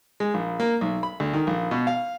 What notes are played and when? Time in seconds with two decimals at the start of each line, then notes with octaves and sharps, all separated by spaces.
0.20 G#3
0.34 A#1
0.60 A#3
0.81 B1
1.03 B5
1.20 D2
1.34 D#3
1.47 A#1
1.71 B2
1.87 F5